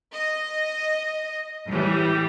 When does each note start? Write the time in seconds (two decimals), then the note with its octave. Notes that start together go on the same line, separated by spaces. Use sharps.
0.12 D#5
1.67 A2 E3 G3